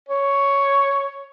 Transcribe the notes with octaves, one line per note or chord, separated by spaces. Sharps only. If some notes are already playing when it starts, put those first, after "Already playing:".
C#5